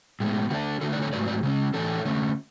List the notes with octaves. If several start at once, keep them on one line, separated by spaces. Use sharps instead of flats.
A2 G#3 B3
D3 A3 D4 F#4
D3 A3 D4 F#4 A4
B4 D5
A4 C#5
G#2 F#3 A3 B4 D5
B4 D5
C#3 G#3 C#4
A2 E3 A3 D4 A4 C#5
D3 A3 C#4